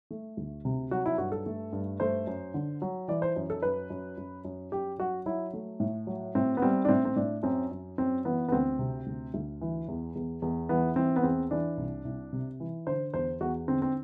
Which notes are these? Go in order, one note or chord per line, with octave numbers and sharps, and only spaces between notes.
A3
D2
C3
F#3 F#4
E4
G2 F#4
A4
A3
G2
A3 C5
F#2
D3
F#3
E3 D5
C5
F#2
A4
F#2 B4
F#2
F#2
F#2
F#2 G4
F#3 F#4
F#3 E4
A3
A2
F#3
A2 C4
B3
G3 C4
D4
A2 C4
C4
A2 D4
F#2 C4
F#2
F#2 C4
E3 B3
B3
D2 C4
C3
D2
D2
E3
E2
E2
E2
E3 B3
E3 C4
B3
E2 C4
E3 D4
C2
C2
C3
E3
D3 C5
E2 C5
E2 F#4
D3 C4
C4